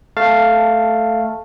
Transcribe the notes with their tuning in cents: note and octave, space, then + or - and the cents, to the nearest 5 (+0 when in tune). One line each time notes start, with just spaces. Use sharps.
A3 +0 F5 +0 A5 +10